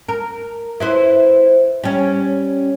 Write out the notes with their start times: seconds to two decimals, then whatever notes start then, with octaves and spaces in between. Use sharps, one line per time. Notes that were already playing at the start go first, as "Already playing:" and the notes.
0.09 A#4
0.80 E4 B4 C5
1.84 G3 C#4